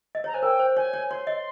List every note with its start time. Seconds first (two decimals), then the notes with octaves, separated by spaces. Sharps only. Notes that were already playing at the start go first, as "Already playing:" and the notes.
0.15 D#5
0.24 C#5 A#5
0.34 C5 G#5
0.42 A#4 G5
0.59 C5
0.77 C#5 G#5
0.94 C#5
1.10 C#5 C6
1.27 D#5